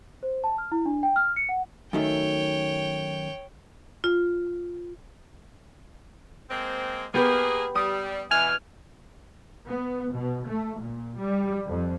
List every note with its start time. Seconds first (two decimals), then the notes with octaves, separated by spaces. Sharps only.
0.23 C5
0.44 A5
0.58 F6
0.72 E4
0.86 D4
1.03 G5
1.16 F6
1.36 C#7
1.49 F#5
1.93 F#2 D#3 A3 C#5 G5
4.04 F4
6.50 G#3 A#3 C4
7.14 A#3 B3 G4 G#4 B4
7.75 G3 D#6
8.31 B2 E3 G#5 F6
9.68 B3
10.13 B2
10.48 A3
10.80 A#2
11.19 G3
11.68 F2